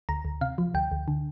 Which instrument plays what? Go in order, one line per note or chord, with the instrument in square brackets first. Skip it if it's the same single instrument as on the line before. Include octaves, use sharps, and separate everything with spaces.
[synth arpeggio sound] D2 A#5
D2
C3 F5
F3
D2 G5
D2
D3